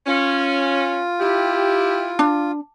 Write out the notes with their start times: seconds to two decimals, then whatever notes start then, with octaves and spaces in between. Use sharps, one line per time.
0.07 C#4 F4
1.20 E4 G4
2.19 D4